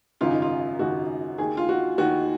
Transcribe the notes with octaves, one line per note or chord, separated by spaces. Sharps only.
G#1 F#2 C#3 F4
D#4
F4
G#1 F#2 C#3 F#4
D#2 D#3 G#4
F4
F#4
D#2 D#3 F#4